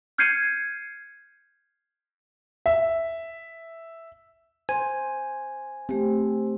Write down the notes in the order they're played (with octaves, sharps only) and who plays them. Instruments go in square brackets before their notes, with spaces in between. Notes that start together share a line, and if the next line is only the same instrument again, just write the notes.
[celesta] F6 G6 G#6 C7 C#7 D#7
[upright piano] E5
[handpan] C5 [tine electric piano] G#5
[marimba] A3 G4 [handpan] C4